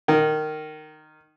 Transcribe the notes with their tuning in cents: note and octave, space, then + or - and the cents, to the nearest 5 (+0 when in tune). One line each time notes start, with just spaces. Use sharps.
D#3 -15